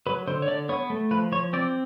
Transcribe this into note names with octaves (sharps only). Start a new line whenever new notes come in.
F#3 B4
D3 C5
C#5
D3 D5
B3 C#5
A3
F3 B4
F3 C#5
C4 D5